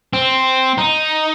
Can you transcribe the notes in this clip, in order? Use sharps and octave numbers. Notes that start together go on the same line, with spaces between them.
C4
D#4